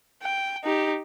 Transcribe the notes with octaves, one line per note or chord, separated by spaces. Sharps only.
G5
D#4 G4